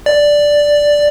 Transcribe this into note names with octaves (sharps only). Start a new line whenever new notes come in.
D5